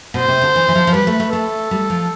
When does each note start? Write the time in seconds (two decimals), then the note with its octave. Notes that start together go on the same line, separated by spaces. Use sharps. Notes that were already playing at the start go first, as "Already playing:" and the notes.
0.14 B2 C5
0.28 C3
0.42 D3
0.56 E3
0.68 E3
0.75 F3
0.87 F3
0.94 G3 B4
1.07 A3
1.20 A3
1.33 A3 A4
1.71 G3
1.90 F3